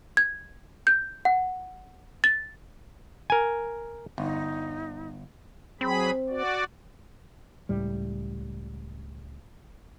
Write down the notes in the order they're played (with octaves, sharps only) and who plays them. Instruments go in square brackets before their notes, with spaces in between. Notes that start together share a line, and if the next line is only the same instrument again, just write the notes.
[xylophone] G#6
G6
F#5
A6
[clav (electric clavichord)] A#4 G#5
[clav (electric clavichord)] G1 [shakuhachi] D#4
[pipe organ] F#3 G#4 B5 [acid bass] C4
[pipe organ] F#4 D5
[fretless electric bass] C#2 A2 G3